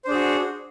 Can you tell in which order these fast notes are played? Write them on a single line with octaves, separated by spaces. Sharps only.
C5 D4 G#4 F#4